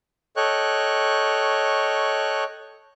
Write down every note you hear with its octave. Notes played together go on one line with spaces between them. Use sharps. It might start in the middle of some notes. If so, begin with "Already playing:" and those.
A4 C#5 D#5 G5 C#6 F#6